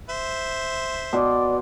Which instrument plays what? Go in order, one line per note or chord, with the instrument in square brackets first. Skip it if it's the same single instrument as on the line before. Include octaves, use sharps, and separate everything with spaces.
[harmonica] C5 E5
[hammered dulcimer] B2 C6 [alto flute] D5